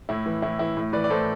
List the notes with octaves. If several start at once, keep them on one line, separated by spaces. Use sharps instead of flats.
A2 E4
E3
A2 E4
E3 E4
A2
E3 B4 D5
D5
A2 A4 C5